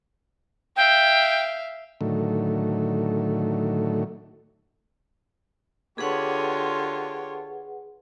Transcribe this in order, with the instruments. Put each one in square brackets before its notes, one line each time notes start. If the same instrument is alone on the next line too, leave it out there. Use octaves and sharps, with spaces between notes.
[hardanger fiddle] E5 F5 [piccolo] G5
[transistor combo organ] A2 D3 D#3 F#3 A3
[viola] D3 F4 [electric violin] G4 C#5 [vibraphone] G#4 B4 F#5